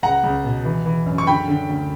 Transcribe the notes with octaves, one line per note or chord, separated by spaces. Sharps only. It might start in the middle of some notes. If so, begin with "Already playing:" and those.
C#2 F#5 A#5
C#2
B2
E3
E3
F#2
C#6
D3 G5 B5
D3
D2